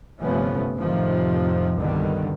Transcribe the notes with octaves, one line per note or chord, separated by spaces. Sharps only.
G1 C3 F3 A3 B3 C#4
F2 A2 C3 D#3 F3
C2 G2 B2 D3 D#3 G3